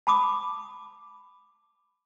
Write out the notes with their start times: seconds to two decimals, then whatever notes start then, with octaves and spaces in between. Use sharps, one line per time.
0.07 A5 B5 D6 D#6